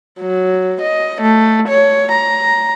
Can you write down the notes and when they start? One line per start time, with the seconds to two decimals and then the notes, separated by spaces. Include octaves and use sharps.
0.20 F#3
0.82 D#5
1.21 A3
1.68 C#5
2.12 A#5